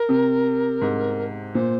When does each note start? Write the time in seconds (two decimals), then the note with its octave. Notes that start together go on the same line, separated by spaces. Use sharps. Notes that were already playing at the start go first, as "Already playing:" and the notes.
Already playing: A#4
0.09 C3
0.81 G#2
1.54 A#2 C5